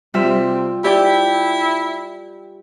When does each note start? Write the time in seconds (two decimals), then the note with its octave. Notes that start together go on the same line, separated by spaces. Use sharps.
0.14 C3 G3 F4 E5
0.84 E4 G4 D5 G5